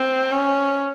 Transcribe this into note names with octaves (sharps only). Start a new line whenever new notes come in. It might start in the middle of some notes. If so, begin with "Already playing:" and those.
Already playing: C4
C#4